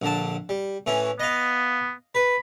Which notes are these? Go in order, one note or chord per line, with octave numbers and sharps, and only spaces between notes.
A#1 D3 A5
G3
A2 E3 C#4
B3 D#5 F5
B4 B5